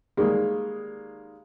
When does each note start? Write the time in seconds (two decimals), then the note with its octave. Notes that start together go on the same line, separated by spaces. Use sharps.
0.17 D#3 G3 G#3 A#3